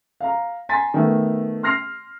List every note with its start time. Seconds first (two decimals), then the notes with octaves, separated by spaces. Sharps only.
0.20 F5 A#5
0.69 G#5 A#5 C6 A6 B6
0.94 D#3 A3 B3
1.63 C6 F6 A#6 C7 F7